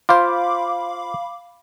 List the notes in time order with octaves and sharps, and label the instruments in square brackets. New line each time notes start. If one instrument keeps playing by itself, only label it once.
[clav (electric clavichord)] F4 C5 [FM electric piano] F5 B5 D6